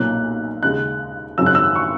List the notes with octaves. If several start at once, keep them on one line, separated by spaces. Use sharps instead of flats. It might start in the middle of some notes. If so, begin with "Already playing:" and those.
Already playing: B1 A#2 A#3 C#4 F#6
D#2 C#3 G#3 F#6
G#1 F#2 C#3 F#3 C#4 E6
F#6
E6
C#6